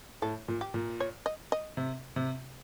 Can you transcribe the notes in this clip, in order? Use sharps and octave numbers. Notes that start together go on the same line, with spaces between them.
A2 A4
A#2
G4
A#2
C#5
D#5
D#5
C3
C3